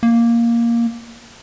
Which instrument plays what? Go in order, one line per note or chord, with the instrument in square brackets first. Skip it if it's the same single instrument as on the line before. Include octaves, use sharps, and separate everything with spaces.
[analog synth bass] A#3